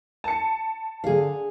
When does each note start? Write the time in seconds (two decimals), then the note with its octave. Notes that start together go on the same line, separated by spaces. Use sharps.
0.24 A5 C#7
1.04 D3 G#4 F5